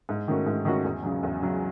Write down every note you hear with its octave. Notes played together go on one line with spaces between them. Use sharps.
G#2
D#3 A3 C#4 F#4
G#2
D#3 A3 C#4 F#4
E2
C#3 F#3
E2
C#3 F#3